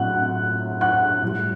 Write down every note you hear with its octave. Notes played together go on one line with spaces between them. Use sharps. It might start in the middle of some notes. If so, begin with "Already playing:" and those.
Already playing: A2 F#3 F#5 F#6
F#5 F#6
A2 G3